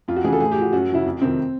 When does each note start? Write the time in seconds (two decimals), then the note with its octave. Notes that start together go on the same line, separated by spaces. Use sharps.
0.08 F2 F4
0.16 F#4
0.24 C#3 E3 G#4
0.33 A4
0.40 A2 G#4
0.52 G4
0.57 F3 F#4
0.73 F#2 F#4
0.90 C#3 F3 E4
1.06 F2
1.21 C3 D#3 C4